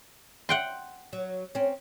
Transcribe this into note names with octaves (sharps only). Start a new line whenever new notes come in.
F#5 G5 C6
F#3
C4 C#4